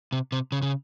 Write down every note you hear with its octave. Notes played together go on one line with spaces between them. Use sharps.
C3
C3
C#3
C#3